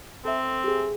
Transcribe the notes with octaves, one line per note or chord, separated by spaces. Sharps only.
C4 A4 E5
G4 G#4